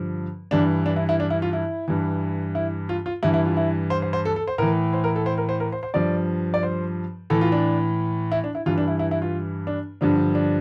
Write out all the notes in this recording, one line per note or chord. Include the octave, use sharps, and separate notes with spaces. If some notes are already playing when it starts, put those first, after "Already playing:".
Already playing: G2 D3 F3
G2 E3 D4
D4
E4
E4
D4
E4
F4
E4
G2 E3
E4
F4
F4
G2 E3 E4
E4
F4
E4
C5
C5
C5
A4
A4
C5
A2 E3 A#4
C5
A#4
A4
C5
A#4
C5
A#4
C5
C5
G2 F3 D5
D5
C5
A2 E3 A4
F4
D4
E4
D4
E4
G2 E3 F4
D4
E4
E4
E4
F4
D4
G2 D3 F3 D4
D4